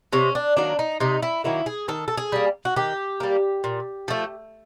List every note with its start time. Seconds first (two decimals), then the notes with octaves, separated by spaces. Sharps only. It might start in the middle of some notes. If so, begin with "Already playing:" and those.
0.13 C3 C#4
0.35 D4
0.57 D#3 F#3 A#3 D4
0.79 D#4
1.00 C3 D#4
1.22 E4
1.44 D#3 F#3 A#3 E4
1.66 G#4
1.88 D#3 A4
2.08 A4
2.17 G#4
2.32 G3 A#3
2.65 F#4
2.76 D#3 G4
3.20 G3 A#3
3.64 A#2
4.08 F3 A3